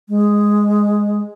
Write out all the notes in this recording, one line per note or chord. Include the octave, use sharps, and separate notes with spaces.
G#3